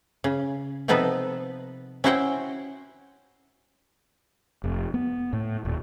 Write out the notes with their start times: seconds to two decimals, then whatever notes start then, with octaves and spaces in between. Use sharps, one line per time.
0.24 C#3
0.88 C3 F3 B3 D#4 A4 B4
2.04 C#4 E4 F#4 C5 F#5 G5
4.64 F1
4.94 B3
5.33 A2
5.65 D#1